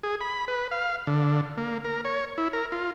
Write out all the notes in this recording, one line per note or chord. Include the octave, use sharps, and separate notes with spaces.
G#4
B5
B4
F5
D3
A#3
A#4
C#5
E4
A#4
F4